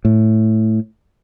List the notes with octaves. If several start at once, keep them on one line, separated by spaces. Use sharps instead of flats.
A2